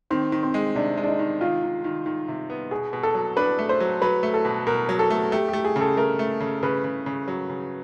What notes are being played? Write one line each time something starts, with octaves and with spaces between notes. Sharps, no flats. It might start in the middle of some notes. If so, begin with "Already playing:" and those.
D#3 C4
D#3
C4
G#3
C3 D4
G#3
D4
D#4
D#3
D#3 F4
D#3
D#3
D#3
C3
B3
B2 G#4
B2
A4
F#3
D4 B4
A3
C5
F#3
F#3 B4
A3
A4
B2
B2 A#4
F#3
A4
A3
A3 G4
A3 G4
G#4
C#3
A4
A3 A#4
A3
C#3
C#3 B4
C#3
C#3
F#3
C#3